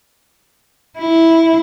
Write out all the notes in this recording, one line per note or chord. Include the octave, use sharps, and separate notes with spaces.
E4